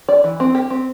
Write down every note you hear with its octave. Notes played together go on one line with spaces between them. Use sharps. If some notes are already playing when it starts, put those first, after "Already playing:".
D5
E3
C4
G4
C4